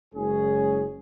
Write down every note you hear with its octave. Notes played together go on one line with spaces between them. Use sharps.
F#1 G#3 C#4 G#4